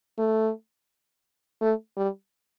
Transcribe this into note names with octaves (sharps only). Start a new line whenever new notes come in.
A3
A3
G3